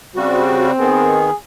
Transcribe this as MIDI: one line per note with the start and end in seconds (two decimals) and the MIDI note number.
0.15 0.72 49
0.15 0.72 55
0.15 1.28 60
0.15 0.72 66
0.79 1.31 51
0.79 1.31 59
0.79 1.35 68